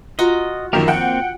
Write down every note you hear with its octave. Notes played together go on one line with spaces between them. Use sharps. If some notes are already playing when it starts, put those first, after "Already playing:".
F4 F#4 D#5 A#5
F#2 D#3 F3 A#3 G4 A#4
A#3 C4 F#5 G5